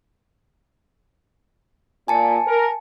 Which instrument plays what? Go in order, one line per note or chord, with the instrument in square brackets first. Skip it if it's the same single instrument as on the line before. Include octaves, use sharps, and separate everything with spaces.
[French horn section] A#2 [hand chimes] G#5 A5 C#7
[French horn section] A#4